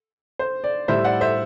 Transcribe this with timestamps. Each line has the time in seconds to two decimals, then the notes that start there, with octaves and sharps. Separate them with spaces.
0.39 C5
0.64 D5
0.88 A2 G3 C5 E5
1.04 D5 F#5
1.21 C5 E5